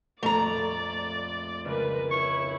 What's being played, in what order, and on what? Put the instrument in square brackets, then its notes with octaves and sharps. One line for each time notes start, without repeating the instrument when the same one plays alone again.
[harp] A#1 F2 [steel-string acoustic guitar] A3 A#5 [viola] D5
[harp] C#2 [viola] A#4 B4
[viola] E4 C#5 [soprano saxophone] C#6